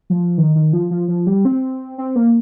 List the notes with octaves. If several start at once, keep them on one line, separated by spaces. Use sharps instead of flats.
F3
D#3
D#3
F3
F3
F3
G3
C4
C4
A#3